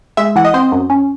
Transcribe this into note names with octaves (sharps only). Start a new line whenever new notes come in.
G#3 E5
E3 F#5
D#5
C4 C5
F#2
C#4